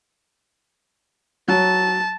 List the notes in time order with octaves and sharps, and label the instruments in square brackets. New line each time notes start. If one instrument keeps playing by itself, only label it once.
[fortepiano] F#3 [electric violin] A5